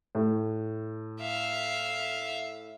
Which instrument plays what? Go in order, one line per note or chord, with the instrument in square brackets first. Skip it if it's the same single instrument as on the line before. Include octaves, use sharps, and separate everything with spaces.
[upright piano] A2
[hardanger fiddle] E5 F5